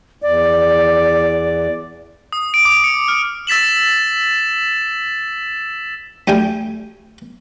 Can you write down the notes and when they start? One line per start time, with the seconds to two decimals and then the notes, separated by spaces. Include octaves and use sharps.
0.22 E2 D5
2.32 D#6
2.54 D7
2.65 D6
2.84 C#7
3.08 F6
3.47 E6 A6 B6 E7 F#7
6.28 D2 G3 G5 G#5